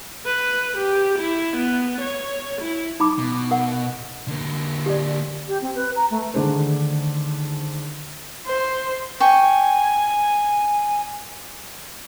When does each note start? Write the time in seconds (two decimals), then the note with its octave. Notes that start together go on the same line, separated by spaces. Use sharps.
0.26 B4
0.77 G4
1.19 E4
1.56 B3
2.01 C#5
2.61 E4
3.00 D#4 B5 D6
3.18 B2
3.51 A#4 F#5
4.28 D3 A#3
4.86 G4 D5
5.48 G4
5.62 C4
5.75 B4
5.96 A#5
6.11 A3
6.34 D3 D#3 A3 D4 G#4 C5
8.47 C5
9.20 G5 G#5 C#6